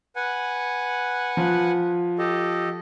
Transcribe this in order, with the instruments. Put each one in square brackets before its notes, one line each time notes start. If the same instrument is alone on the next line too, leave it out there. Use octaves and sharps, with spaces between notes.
[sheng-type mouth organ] B4 F#5 G#5
[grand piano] F3
[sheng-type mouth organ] G4 A4 D#5